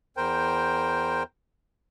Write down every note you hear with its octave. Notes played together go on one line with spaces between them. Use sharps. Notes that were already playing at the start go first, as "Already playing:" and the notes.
E2 A#4 C5 G5